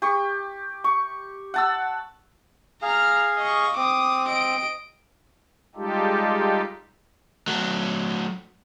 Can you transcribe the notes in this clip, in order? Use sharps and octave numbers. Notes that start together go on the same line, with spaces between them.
G4 C#6
C#6
F#5 A5 E6
G#4 F5 A#5 F6
D#5 C#6
C4 D6 D#6
D#5 D7
G3 G#3 D#4 F4 G4 A4
F#3 A3